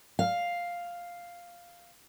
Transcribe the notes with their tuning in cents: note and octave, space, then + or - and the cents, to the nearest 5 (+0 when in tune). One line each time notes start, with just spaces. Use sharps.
F5 +0